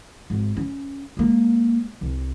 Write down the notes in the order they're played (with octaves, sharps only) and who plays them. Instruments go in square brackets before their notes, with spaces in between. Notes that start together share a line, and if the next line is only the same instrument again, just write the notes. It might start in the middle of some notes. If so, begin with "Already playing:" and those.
[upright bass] G#1
C#4
G#3 A#3
C2